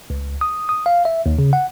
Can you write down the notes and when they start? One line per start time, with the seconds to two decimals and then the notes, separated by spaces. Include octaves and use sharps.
0.10 C#2
0.41 D#6
0.69 D#6
0.86 F5
1.05 E5
1.26 D#2
1.39 C#3
1.53 F#5